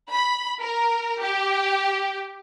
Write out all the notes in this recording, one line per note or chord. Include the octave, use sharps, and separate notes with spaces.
B5
A#4
G4